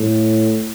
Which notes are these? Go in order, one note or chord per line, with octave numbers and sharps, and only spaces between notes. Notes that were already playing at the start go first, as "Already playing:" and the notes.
Already playing: A2